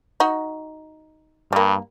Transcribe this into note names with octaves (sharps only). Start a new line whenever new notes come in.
D#4 F#4
G2 G3 A#3